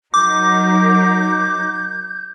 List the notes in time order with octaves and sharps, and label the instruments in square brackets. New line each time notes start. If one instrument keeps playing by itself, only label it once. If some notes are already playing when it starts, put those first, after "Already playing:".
[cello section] F#3 D#4 A#4 [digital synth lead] D6 [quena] G6